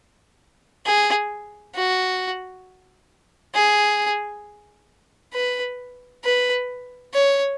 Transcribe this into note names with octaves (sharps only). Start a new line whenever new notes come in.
G#4
F#4
G#4
B4
B4
C#5